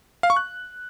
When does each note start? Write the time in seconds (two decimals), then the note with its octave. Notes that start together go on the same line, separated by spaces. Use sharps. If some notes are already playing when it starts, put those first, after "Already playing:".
0.23 F5
0.30 C#6
0.36 F#6